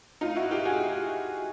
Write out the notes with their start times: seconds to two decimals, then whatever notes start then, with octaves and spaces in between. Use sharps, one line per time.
0.21 D#4 F4
0.36 E4 F#4
0.51 F4 G4
0.65 F#4 G#4